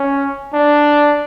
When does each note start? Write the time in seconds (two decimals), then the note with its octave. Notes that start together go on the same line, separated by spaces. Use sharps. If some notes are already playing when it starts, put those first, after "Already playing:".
Already playing: C#4
0.54 D4